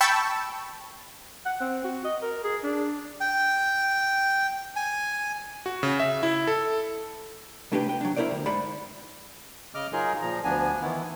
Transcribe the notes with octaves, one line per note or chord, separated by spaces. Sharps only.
G5 A5 B5 C#6 E6
F#5
C4
F#4
D#5
A#4
G#4
D4
G5
G#5
F#4
C#3
E5
E4
A4
C2 A2 D4 G4 B4 G5
G5
F#3 D4
E4 G4 A#4 C5 D5
D2
G#2 C5 D5 F#5 B5
C#3 D#5 D6 F6
F#3 D#4 F4 G#4 A#4
A#2 F3 A#5
D2 F3 B3 D4 G#5
D#3 E3 B3 E4